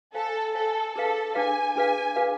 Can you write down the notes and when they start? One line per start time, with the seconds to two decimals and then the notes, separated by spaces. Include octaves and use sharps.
0.14 A4 C5 F5 G#5
0.54 A4 C5 F5 G#5
0.95 D4 G#4 A4 B4 F5
1.35 D4 G#4 B4 F5 G#5
1.76 D4 G#4 B4 F5 G#5
2.16 D4 G#4 B4 F5